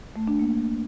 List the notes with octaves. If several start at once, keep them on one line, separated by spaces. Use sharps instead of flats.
A3
D4
A#3